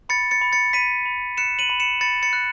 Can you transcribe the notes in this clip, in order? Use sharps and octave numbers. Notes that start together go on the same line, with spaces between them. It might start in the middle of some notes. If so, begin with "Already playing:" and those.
B5 A6 C#7
A6 C#7
B5
A6 C#7
B5 B6 D#7
B5
F#6 C#7 E7
D#7 F#7
B5
C#7 E7
B5 A6 C#7
A6 C#7
F#6